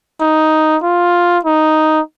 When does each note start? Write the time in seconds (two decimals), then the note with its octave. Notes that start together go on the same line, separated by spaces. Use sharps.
0.21 D#4
0.83 F4
1.45 D#4